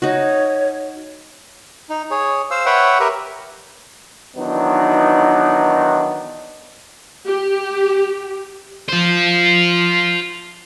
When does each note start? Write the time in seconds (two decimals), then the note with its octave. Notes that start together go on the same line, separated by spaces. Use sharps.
0.02 D#4 F#4 C#5
1.90 D#4
2.11 G#4 C#5
2.51 C5 F5 E6
2.66 B4 C#5 E5 F#5 G5
3.00 G4 A#4 B4 E5
4.36 D#3 E3 F#3 B3 D4 D#4
7.27 G4
8.88 F4 C5